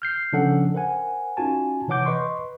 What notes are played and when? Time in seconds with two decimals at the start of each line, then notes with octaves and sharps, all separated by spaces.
0.02 F6 G6 C7
0.33 C#3 F3 C#4 D4 A4 F#5
0.74 A#4 C5 F#5 G#5
1.37 C#4 D#4 F4 F#4 G#5 A5
1.88 C3 E3 C#5 F#5 D6 G6
2.05 B4 D#5 C6 C#6